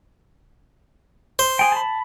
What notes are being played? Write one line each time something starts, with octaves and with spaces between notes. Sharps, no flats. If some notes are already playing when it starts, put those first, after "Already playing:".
C5
G#4 G5
A5 B5